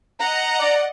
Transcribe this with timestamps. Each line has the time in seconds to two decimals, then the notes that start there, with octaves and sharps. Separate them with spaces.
0.20 D#5 F#5 A#5
0.60 D5